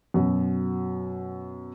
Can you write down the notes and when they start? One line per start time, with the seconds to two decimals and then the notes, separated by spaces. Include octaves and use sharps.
0.14 F#2 B2